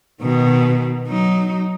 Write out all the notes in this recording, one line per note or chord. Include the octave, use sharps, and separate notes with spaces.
B2 D#3
F#3 D#4